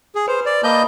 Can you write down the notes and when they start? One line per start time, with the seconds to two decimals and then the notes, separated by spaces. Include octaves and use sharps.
0.15 G#4
0.28 B4 C5
0.46 D5
0.64 A#3 D#5 A5 B5 D#6 G6